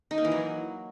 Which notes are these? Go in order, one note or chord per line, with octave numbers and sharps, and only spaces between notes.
D#4
A#3
E3
F#3